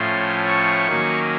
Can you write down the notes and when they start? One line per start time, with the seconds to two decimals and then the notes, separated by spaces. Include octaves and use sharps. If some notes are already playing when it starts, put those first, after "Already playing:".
Already playing: A2 F3 A3 C#4 C6
0.47 C#6
0.87 D#3 F#3 A#3 C#4